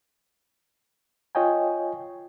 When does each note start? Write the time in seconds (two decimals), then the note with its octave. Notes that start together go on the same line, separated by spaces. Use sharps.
1.35 F4 C#5 D#5 G5 G#5